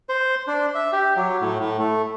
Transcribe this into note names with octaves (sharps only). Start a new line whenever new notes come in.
C5
D4
E5
G4
F#3
A2
A2
A3